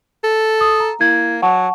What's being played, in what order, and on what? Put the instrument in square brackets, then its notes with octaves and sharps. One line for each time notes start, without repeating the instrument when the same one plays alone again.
[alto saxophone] A4
[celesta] D#6
A#5
[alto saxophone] A#3 [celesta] E4 G#6
[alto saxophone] F#3 [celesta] F#5 A5 C#6